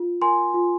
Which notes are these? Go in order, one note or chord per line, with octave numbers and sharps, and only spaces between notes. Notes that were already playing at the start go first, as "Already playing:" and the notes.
Already playing: F4
A#4 G#5 C6
F4